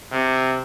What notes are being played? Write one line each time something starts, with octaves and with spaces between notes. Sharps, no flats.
C3